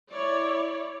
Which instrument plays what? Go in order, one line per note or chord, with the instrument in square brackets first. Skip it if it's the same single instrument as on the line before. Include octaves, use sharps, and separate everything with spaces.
[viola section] E4 C#5 D5